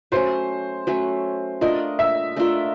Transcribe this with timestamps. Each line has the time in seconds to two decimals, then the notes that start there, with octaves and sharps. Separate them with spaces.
0.12 F#3 A3 C#4 C5
0.87 F#3 A3 C#4
1.61 A3 D4 F4 A#4 D#5
1.99 E5
2.36 A3 D4 F4 A#4